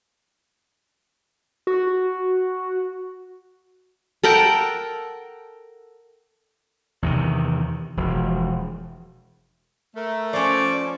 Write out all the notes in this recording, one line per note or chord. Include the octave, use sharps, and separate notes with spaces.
F#4
A4 A#4 F#5 G5
E2 C3 D#3
E1 F3
A3 A#4
F3 C#4 C5 D5 C#6 D6